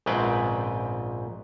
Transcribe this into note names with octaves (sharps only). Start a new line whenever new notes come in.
A#1 G#2 C#3 C4 B4 G5